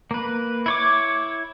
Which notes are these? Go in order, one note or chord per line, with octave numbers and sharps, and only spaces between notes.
A#3 B4
E4 C#5 D6